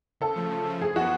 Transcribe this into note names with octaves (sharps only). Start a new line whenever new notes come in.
C#3 A4
F3 A3
C#3
F3 A3
F#2 G#4
F3 B3 F#4